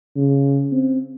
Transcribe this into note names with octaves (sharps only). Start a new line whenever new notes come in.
C#3
C4